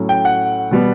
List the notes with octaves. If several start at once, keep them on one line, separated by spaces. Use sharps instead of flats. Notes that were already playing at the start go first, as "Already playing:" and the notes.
Already playing: A2 F#3 C#4
G5
F#5
B2 G3 B3